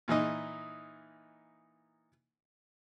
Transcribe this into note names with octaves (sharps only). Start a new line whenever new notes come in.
A#2 E3 D#4 D#5